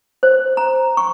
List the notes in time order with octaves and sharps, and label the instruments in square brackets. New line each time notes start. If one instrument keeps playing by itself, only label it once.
[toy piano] C5
A#5
C#6